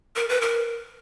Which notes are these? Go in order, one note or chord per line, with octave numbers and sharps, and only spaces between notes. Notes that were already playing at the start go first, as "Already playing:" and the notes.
A#4
B4
A#4